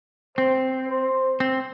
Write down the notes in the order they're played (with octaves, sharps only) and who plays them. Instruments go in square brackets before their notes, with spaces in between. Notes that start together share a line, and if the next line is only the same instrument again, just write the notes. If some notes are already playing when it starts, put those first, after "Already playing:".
[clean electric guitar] C4 [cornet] C5
[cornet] C5
[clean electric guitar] C4